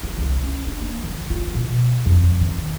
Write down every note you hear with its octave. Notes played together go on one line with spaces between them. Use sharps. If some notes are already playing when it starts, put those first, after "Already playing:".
E4
C2
C#4
D4
A#3
D#3
F4
B2
F2
D#3